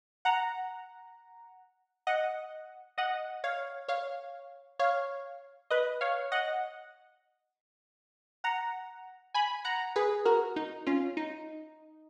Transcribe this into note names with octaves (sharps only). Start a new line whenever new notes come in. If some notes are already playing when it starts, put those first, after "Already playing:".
F#5 A#5
D#5 F#5
D#5 F#5
C#5 F5
C#5 F5
C#5 F5
B4 D#5
C#5 F5
D#5 F#5
F#5 A#5
G#5 B5
F#5 A#5
G#4 B4
F#4 A#4
D#4
C#4 F4
D#4